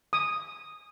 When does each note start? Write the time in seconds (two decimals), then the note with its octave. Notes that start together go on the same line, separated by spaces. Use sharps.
0.13 D#6